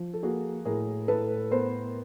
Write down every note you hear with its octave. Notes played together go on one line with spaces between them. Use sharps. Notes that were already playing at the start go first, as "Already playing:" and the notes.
Already playing: F3
A4
A#3 F#4 G#4
A2 G#4 A#4
A2 A4 B4
B3 A#4 C5